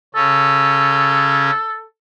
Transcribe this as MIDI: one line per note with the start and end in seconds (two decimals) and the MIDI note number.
0.15 1.51 49
0.15 1.51 61
0.15 1.84 69